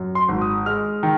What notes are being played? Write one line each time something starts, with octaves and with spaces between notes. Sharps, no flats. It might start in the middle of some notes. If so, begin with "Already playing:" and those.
Already playing: F#2
C6
G#1
D#6
G#3 F6
D#3